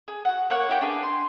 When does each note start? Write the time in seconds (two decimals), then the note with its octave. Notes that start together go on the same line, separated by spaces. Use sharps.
0.08 G#4
0.25 F#4 F#5
0.50 A#3 C#5 F#5 F#6
0.69 E4 F#4 G4 G5
0.81 D4 G#4 B4
1.03 C6